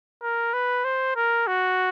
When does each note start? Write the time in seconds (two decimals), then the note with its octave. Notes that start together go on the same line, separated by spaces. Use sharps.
0.22 A#4
0.53 B4
0.84 C5
1.16 A#4
1.47 F#4